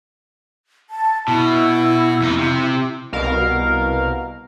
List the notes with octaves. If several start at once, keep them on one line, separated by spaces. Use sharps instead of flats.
A5
B2 E4
F2 D#4
C3
C2 B2 A#4 F5